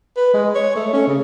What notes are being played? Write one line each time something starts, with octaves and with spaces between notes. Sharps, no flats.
B4
G#3
C#5
A3
C#4
C#3